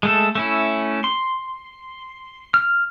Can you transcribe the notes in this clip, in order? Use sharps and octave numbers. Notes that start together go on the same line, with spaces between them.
G#3 A3 A4
A3 C#4 E4
C6
F6